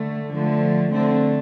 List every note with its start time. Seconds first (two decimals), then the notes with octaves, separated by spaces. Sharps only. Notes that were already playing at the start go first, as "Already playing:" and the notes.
Already playing: D3 A3
0.32 D3 F3 A3
0.90 D3 A3 C4